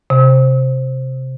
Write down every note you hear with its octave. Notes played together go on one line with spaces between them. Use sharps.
C3